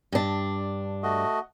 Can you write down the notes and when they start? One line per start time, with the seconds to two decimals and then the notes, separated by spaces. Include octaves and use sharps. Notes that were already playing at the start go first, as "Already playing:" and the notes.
0.12 G2 D4
1.03 A3 F#4 D#5